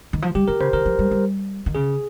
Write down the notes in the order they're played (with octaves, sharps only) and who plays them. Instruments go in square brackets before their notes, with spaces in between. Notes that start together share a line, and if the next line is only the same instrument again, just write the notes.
[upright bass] D#3
F3
[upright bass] G3 [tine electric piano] G4
[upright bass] F3 [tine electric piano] A#4
[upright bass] C#3 [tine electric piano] C5
[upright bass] D#3 [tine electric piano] A#4
[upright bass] F3
G3
G3
D#3
[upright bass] C#3 [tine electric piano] G#4